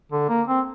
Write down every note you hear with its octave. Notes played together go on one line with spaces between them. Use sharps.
D3
A#3
C4